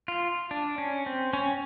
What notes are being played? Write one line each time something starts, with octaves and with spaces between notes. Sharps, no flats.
F4
D4
C#4
C4
C#4